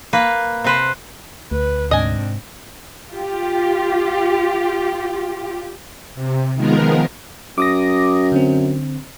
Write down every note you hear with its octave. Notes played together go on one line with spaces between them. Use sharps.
A#3 B4
C3 B4 C5
D2 B4
G#2 C3 C4 D4 D#5 G#5
F4 G4
C3
D#3 F3 G#3 B3 A#4
F#2 D6 D#6 A#6
D3 C4